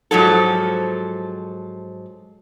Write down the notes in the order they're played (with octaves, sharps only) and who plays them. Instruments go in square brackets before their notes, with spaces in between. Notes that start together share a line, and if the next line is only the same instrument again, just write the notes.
[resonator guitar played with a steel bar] G#2 F3 F#3 A4